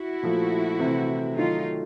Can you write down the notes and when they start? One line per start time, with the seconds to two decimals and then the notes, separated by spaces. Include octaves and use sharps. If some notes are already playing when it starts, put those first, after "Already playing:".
Already playing: E4 F#4
0.22 A#2 F3 A3
0.79 C3 E3 A3 C4
1.36 D#3 F#3 A3 D#4 F4